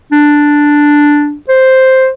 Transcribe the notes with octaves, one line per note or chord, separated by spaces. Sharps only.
D4
C5